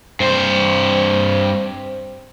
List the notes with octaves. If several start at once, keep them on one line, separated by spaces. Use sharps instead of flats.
G2 C4 C5